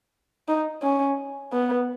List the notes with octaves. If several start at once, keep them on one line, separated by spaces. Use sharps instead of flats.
D#4
C#4
B3